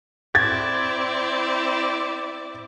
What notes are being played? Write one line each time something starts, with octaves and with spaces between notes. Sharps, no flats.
C4 E4 D5 G#6 A6